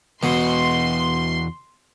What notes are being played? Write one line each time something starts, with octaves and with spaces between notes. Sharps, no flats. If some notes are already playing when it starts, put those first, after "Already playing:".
E2 B2 F#4 C6